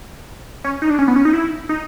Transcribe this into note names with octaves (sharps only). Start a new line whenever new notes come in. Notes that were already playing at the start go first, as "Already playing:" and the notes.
C#4
D#4
D4
C#4
B3
C#4
D#4
E4
D#4